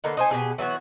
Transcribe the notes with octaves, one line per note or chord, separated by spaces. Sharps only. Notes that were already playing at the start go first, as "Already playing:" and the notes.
D3 A#3 B3 D#4
D#4 C5 G#5
B2 G4 G#4
E3 F#3 B3 F#4